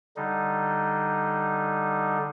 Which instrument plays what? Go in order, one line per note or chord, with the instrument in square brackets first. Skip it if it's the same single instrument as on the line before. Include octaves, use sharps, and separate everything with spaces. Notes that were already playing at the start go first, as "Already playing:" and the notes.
[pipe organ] D3 G3 D#4